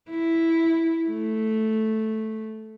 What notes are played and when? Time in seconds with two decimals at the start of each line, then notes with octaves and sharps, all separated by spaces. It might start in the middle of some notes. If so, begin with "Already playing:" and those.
0.10 E4
1.09 A3